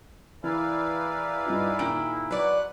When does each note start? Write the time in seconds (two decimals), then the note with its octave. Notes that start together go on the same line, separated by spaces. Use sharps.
0.44 E3 E4 G#4 A#4 B4 D5 F5
1.45 G2 D#4 F4
1.79 A#2 D#3 G5 D7
2.31 B2 F#3 B4 D5 F#5 F#6